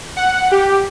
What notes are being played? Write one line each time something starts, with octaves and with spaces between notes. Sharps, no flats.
F#5
G4